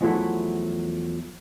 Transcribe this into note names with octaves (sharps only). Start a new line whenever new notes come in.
E2 F3 F#3 A3 E4